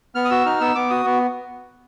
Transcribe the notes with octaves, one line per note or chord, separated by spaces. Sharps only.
B3 F6
D#6
F#4 E6
D#4 F6
B3 E6
B3 D6
F#4 D#6
B3